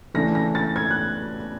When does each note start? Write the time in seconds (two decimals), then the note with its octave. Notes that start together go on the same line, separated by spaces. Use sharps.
0.14 C#3 E3 A3 D4 A#6
0.35 A#6
0.55 A6
0.76 G#6
0.91 F#6